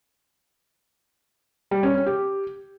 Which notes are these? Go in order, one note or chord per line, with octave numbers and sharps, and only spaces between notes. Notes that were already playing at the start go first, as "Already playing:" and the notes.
G3
C#4
C#4
G4